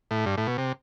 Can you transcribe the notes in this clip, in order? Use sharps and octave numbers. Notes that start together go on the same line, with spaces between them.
A2
G2
A2
B2
C3